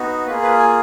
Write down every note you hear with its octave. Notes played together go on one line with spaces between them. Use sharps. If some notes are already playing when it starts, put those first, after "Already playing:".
Already playing: B3 D#4 F#4
A#3 F4 G#4 B4
B4
G#5